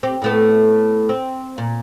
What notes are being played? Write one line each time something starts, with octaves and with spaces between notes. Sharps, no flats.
C4 G4
A2 A3 B3
C4
A#2